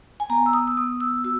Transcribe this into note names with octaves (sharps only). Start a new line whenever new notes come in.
G#5
B3 A#5
E6
D#6
E6
B3 D#6
E6
F#4 E6